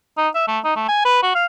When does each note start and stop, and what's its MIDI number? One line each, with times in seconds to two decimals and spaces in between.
0.18 0.28 63
0.35 0.45 76
0.48 0.59 57
0.64 0.73 63
0.76 0.84 57
0.89 1.01 80
1.05 1.19 71
1.23 1.32 66
1.35 1.46 77